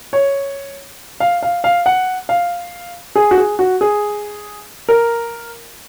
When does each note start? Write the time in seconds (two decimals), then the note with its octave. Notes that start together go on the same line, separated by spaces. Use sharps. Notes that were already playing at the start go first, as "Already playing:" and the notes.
0.13 C#5
1.20 F5
1.43 F5
1.64 F5
1.86 F#5
2.29 F5
3.15 G#4
3.31 F#4
3.37 G#4
3.59 F#4
3.81 G#4
4.89 A#4